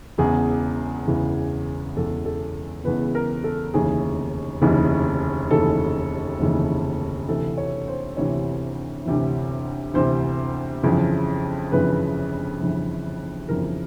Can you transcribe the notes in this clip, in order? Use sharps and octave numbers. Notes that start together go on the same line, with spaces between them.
E1 E2 C#3 E3 G#4
E1 E2 C#3 E3
E1 E2 C#3 E3 A4
A4
E1 E2 C#3 E3 B4
A#4
A4
F1 D#2 C#3 E3 G#4
F1 D#2 C#3 E3
F1 D#2 C#3 E3 A4
F1 D#2 C#3 E3
D2 C3 E3 A4
C#5
C5
D2 C3 E3 C#5
D2 C3 E3
D2 C3 E3 C5
G1 F2 C#3 E3
G1 F2 C#3 E3 B4
G1 F2 C#3 E3
G1 F2 C#3 E3 A#4